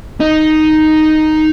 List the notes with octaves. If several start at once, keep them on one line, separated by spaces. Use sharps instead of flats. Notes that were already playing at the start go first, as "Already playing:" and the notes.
D#4